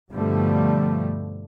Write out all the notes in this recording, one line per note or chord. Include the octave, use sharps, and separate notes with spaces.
G2 B2 D3 F3 G3 A3